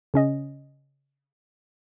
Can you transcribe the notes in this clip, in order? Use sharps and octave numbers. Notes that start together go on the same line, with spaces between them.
C#3 C#4 D#5